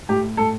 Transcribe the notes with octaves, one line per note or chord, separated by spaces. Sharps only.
A2 G4
A2 A4